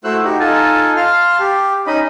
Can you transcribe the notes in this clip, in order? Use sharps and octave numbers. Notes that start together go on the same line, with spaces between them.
A3 E4 F#4 C5 E6 F#6
D#4 F#4 G4
D#4 F4 A4 G#5 A5
F5 A5 C6 F6
G4
C#4 D#4 D#5 B5